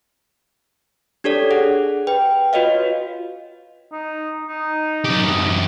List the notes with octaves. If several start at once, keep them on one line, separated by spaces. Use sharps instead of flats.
D4 G4 A4 C#5 D5
G#4 F#5
B4 G5
F4 F#4 B4 C#5 D#5 F5
D#4
D#4
F#2 G4